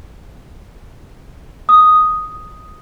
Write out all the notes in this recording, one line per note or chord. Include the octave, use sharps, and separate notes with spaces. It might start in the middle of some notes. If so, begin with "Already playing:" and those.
D#6